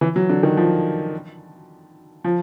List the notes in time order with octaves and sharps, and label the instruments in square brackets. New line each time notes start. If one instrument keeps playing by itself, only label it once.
[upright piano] E3
F#3
D3
D#3
F3
F3